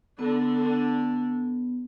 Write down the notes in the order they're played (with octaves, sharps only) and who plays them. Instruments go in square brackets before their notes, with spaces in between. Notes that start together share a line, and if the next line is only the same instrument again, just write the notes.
[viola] D3 D4 [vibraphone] B3